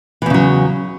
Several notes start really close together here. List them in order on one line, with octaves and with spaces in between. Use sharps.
E3 E2 C#3 F#3